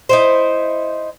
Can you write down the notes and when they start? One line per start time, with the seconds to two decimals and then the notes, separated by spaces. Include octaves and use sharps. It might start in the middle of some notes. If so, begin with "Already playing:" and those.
0.09 D#4 E4 C5